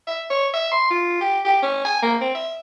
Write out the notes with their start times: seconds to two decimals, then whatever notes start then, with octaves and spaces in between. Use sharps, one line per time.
0.07 E5
0.30 C#5
0.54 E5
0.72 C6
0.90 F4
1.21 G4
1.45 G4
1.62 C#4
1.85 G#5
2.03 A#3
2.21 C4
2.35 E5